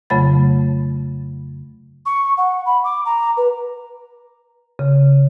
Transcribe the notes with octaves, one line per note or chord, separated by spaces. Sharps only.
F2 C#3 F#3 A3 B5 A6
C#6
F#5
B5
D6
A#5
B4
C#3